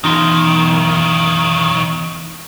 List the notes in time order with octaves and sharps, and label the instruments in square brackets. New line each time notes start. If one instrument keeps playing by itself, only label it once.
[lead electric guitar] B1 D#3 [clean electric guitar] E2 D#4 C6